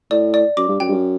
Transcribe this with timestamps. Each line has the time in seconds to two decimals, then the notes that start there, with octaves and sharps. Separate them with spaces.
0.11 A2 D5
0.34 D5
0.57 F#2 D6
0.68 G2
0.80 F#2 G5
0.88 G2
0.91 F#2